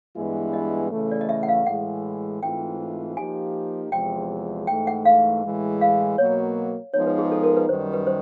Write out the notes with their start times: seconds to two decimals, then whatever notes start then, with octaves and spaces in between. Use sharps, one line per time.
0.16 G2 E3 G#3 B3 E4
0.53 D#5
0.91 C#3 E3 A3
1.11 D5
1.21 D#5
1.29 E5
1.43 F#5
1.48 F5
1.66 A2 E3 G#3 F#5
2.42 G#2 E3 A3 C4 F4 G5
3.17 F3 A#3 D#4 G4 G#5
3.92 E2 C3 F3 G#3 G5
4.67 G#2 E3 A3 G5
4.87 F#5
5.05 F5
5.44 A2 E3 G#3
5.81 F5
6.18 B2 F#3 A#3 C#5
6.94 F3 G#3 B3 D#4 C#5
7.07 B4
7.18 G#4
7.32 A4
7.43 A#4
7.57 B4
7.69 F#2 D#3 G3 C5
7.93 B4
8.07 C5